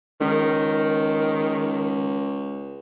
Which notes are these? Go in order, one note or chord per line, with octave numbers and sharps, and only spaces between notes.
C#2 D#3